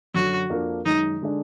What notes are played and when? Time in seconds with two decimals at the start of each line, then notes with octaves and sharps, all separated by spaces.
0.14 F#2 D3 F#3 F#4
0.50 F2 F3 A#3 D4
0.86 F#2 D#3 G#3 D#4
1.21 D3 G#3 D4